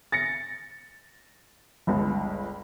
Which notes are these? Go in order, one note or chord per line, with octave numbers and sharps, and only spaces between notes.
A6 A#6 C#7
G1 C#2